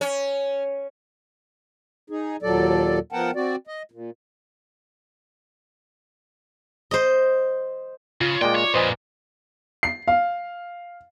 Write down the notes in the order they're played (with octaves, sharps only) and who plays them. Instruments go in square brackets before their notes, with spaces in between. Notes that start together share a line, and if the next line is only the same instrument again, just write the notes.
[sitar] C#4
[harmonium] D#4 G#4
D#2 A#2 F#3 A4 D5
F3 B3 A#4 F#5 G5 A5
C4 F#4 D5
D#5
A#2
[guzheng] C5 D#5
[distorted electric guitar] C#3 [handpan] F4
[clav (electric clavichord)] A#2 G#3 [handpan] D5 [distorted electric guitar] G5
[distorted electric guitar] C#5
[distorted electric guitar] F2 A#2 [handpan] B4 [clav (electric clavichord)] C5 D#5 G#5
[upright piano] C7
F5